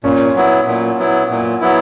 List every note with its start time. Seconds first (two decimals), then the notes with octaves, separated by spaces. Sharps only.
0.04 A#2 C#4
0.36 F#3 B3 E4
0.67 A#2
0.99 F#3 B3 E4
1.30 A#2
1.61 F#3 B3 E4